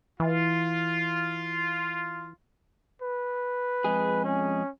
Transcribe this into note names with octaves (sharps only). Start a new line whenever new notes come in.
E3 F4
B4
F2 G#3 G#4
C#4